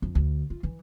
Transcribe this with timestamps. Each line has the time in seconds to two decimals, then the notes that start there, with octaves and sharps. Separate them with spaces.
0.02 F2
0.15 D2
0.50 F4
0.63 E3